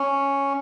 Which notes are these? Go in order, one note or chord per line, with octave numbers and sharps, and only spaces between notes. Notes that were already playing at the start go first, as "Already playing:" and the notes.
Already playing: C#4